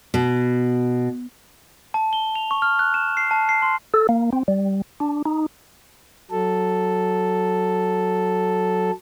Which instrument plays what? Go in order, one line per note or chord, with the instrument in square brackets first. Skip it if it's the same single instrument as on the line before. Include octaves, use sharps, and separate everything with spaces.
[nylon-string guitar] B2
[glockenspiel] A5
G7
F7
C#6
F6
F#6
E7
C7
A5
C7
C6
[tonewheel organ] A4
A#3
C4
G3
D4
D#4
[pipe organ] F#3 A4